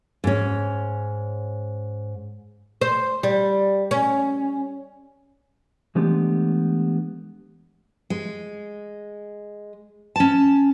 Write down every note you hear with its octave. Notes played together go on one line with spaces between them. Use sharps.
G#2 C#4
C5
G3
C#4
E3 G#3 A3 B3 D4 G4
G#3
C#4 A5